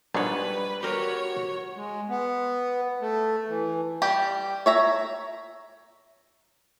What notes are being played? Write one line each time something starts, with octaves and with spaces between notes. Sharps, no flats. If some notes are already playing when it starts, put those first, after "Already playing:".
A#1 G#2 B2 G3 D4 B4 C#5
F#4 G4 A#4 C#5
G#3
B3
A3
E3
G3 G4
C#5 E5 A#5